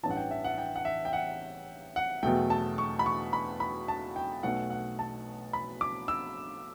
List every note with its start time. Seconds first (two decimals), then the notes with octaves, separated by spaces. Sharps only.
0.03 A1 G2 E3 A5
0.11 F#5
0.17 G5
0.31 E5
0.44 F#5
0.58 G5
0.76 F#5
0.85 E5
1.05 G5
1.13 F#5
1.96 F#5
2.23 E2 B2 F#3 A3 G5
2.50 A5
2.78 C#6
2.99 B5
3.06 C#6
3.33 B5
3.60 B5
3.88 A5
4.16 G5
4.43 B1 B2 A3 F#5
4.70 F#5
4.99 A5
5.53 B5
5.81 D6
6.08 E6